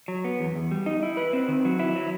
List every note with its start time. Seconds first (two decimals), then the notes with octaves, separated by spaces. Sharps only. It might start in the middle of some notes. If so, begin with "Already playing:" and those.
0.08 F#3
0.24 B3
0.40 E2
0.55 E2
0.71 G3
0.86 D#4
1.03 E4
1.17 B4
1.33 C4
1.48 D#3
1.65 F#3
1.79 E4
1.96 F#3